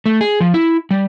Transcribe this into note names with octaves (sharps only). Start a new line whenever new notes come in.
A3
G#4
F3
E4
G3